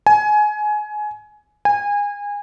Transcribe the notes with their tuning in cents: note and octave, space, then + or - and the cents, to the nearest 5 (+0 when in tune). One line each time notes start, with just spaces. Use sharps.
G#5 +20
G#5 -25